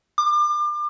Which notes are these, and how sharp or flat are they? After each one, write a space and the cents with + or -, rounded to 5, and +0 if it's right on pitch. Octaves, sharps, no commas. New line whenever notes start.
D6 +35